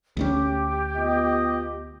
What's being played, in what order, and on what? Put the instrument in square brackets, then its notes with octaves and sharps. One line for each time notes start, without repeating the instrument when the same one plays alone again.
[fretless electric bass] D2 G#3 C#4 [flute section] G4
[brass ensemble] B3 F4 D#5